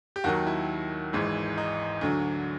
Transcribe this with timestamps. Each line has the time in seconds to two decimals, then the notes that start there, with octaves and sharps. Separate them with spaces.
0.16 G4
0.24 D#2 D#3 F#3 F#4
0.46 E4
1.13 G#1 G#2 E3 G#3
1.58 D#4
2.01 D2 D3 F#3